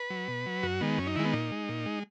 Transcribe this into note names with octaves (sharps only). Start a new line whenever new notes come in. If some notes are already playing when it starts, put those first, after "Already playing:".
Already playing: B4
F#3
B2
F#3
F#2 F#4
D#3 G#3 B3
F#2 C#4
D#4
D#3 G#3 E4
B3
A#2 D#4
G#3
A#2
G#3